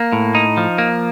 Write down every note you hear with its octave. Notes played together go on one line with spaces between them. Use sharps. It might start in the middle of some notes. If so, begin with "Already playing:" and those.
Already playing: A#3
A2
D#4
F3
A#3